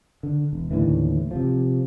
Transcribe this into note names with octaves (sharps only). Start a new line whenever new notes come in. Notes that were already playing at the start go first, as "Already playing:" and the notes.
D3
E1
D#2 A2 D3 E3
C3 F3